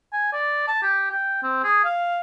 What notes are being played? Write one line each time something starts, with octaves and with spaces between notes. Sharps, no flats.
G#5
D5
A5
G4
G5
C4
G#4
F5